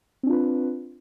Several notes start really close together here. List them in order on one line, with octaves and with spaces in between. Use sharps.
C4 D4 F4 B4